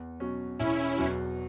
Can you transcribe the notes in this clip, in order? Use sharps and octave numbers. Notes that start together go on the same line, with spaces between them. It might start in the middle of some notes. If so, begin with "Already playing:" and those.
Already playing: E2
B2 F#3 C#4
E1 C#4 E4
E2 B2 F#3